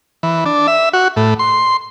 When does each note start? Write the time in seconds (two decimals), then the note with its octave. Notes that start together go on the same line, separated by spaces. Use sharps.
0.23 E3
0.46 D4
0.67 E5
0.93 F#4
1.16 A2
1.39 C6